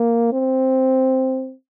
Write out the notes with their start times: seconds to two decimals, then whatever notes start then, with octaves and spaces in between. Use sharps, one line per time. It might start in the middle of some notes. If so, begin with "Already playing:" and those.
Already playing: A#3
0.33 C4